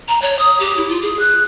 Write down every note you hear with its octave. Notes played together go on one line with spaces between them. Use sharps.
A#5
C#5
D#6
G4
E4
F4
G#4
F#6